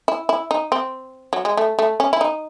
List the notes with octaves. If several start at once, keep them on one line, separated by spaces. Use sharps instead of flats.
E4
E4
D#4
C4
F#3
G#3
A3
A3
C#4
E4
D#4